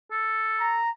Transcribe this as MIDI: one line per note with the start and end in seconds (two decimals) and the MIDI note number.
0.11 0.79 69
0.60 0.90 82